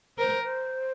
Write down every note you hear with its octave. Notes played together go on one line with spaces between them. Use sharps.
A#4 C5
C5